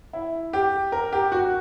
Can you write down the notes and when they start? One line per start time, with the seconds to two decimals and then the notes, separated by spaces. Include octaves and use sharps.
0.13 E4
0.53 G4
0.92 A#4
1.12 G4
1.32 F#4